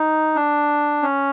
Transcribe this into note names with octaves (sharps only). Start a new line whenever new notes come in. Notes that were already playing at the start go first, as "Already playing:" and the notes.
Already playing: D#4
D4
C#4